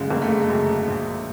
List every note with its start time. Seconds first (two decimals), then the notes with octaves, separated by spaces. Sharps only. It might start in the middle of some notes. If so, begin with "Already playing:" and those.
Already playing: G1 F#2 C#3 G#3 A3
0.10 G1 A#3
0.22 A3
0.32 G#3
0.42 A3
0.49 F#2 C#3
0.87 A#1